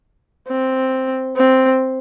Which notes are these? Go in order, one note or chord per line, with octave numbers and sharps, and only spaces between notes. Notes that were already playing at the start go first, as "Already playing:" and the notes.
C4
C4